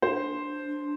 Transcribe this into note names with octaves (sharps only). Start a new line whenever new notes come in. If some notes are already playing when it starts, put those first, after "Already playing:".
D4 C5